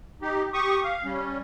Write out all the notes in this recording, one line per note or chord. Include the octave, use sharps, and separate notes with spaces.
D#4 G4
G4 C#6 D#6
F5
G3 C#4